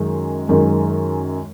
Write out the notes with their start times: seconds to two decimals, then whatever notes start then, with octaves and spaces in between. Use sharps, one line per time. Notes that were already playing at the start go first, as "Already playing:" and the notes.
Already playing: F#2 D#3 G#3
0.49 F#2 D#3 G#3